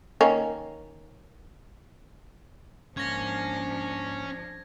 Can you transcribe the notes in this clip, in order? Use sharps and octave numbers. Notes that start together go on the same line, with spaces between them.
D#3 A#3 C#4
G#2 F3 A#3 C#4 D4 G#6 A#6